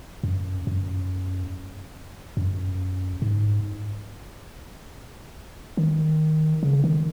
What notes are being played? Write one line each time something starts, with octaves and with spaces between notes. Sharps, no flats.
F#2
F#2
F#2
G#2
D#3
C#3
D#3